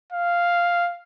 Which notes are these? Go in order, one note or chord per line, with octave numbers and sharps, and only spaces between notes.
F5